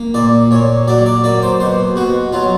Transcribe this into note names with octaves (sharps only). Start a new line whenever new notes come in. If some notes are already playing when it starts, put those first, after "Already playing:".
Already playing: A#3
A#2 D5
A#2 C#5
F#3 D5
D5
A#3 D5
C5
B2 C5
B2 F#4
F#3 F4